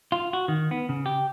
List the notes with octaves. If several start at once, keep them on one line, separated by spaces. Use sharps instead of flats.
F4
F#4
D#3
B3
C#3
G4